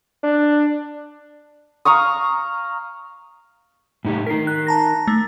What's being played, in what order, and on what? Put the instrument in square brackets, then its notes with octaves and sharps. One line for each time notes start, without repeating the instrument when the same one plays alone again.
[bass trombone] D4
[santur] F5 A#5 C#6 D#6
[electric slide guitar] A2 D#4 G4
[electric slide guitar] D#4 A#4 [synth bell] B6 C7
[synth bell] F#6
A5 A#5 A#6
A3